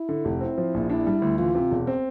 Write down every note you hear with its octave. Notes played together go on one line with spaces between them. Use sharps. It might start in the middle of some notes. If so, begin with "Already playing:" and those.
Already playing: E4
D3
F1
C4 E4
F3
A#1
D4 E4
G3
D2
E3 F4
C3
E1
C4